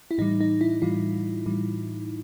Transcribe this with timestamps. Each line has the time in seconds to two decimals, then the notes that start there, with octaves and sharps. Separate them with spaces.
0.11 E4
0.18 A2 E3 G3 D#4
0.41 D#4
0.61 E4
0.82 A2 E3 G3 F4
1.46 A2 E3 G3